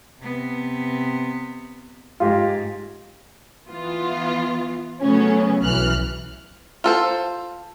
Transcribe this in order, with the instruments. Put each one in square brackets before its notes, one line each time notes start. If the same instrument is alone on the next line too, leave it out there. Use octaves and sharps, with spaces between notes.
[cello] C3 B3
[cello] G#2 [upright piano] F4 G4
[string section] E3 B3 F4
C#3 F#3 A3 B3 C#4
B1 E3 F6 F#6
[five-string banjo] F4 A4 C5